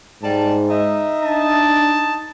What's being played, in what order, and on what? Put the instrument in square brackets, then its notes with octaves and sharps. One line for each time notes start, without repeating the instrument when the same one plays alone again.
[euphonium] G#2 [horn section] G3 D5 A5
[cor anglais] D#4 [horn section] D#5 E5
[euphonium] D4 [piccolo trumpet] A5